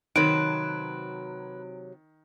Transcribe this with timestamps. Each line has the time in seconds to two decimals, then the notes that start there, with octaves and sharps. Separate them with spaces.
0.16 C3 D#3 F#3 B4 C5 D7